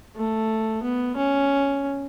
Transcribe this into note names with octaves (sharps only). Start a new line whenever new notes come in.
A3
B3
C#4